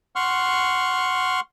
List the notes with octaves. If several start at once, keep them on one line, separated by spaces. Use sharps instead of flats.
F#5 C6 C#6 F6